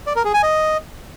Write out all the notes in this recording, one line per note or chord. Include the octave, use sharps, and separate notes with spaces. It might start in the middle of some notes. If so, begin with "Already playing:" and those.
D5
A#4
G#4
G#5
D#5